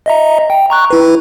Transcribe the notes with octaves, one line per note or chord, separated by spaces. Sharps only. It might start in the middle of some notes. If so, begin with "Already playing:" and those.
D#5 E5 A#5
G5
A#5 C#6 F#6
E4 B4